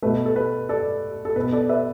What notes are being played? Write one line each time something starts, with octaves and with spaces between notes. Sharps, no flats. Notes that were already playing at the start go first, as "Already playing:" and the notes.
B2 A3 B4
A4
B4
A4 D5
A4
B2 B3 B4
A4 D5
B4 E5